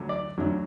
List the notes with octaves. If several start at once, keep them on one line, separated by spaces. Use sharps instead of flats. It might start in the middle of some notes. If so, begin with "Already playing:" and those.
Already playing: D2 D3 F#3
D5
D2 D3 F#3